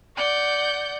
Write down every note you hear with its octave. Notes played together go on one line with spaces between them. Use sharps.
D5 F#5 G6